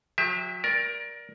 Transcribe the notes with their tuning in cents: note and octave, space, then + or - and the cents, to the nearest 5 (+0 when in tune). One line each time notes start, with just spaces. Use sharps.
F#3 -35 G4 +30 E5 -15
A#4 +20 D5 -5